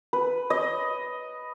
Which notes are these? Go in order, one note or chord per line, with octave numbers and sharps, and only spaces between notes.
B4
D#5